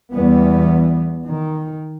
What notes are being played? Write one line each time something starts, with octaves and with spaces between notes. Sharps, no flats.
E2 E3 G3 B3
D#3